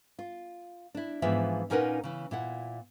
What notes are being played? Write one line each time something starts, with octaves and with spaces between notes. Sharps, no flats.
F4
D4 E4
G#2 E3 F3 B3 F4 E5
A#2 C#4 D#4 A#4 B4 F#5
C#3 E3
A#2 E4 F#5